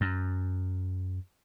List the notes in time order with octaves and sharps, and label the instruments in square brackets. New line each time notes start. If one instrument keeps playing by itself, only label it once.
[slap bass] F#2